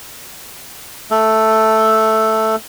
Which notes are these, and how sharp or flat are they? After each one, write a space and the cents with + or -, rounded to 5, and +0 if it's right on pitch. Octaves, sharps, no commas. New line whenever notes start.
A3 +0 A4 +0